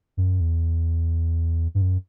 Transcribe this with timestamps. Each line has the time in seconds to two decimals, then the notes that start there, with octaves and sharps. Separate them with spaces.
0.17 F#2
0.40 E2
1.75 G2
1.82 F#2